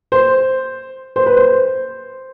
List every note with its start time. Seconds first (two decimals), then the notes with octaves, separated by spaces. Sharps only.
0.12 C5
1.16 C5
1.26 B4
1.37 C5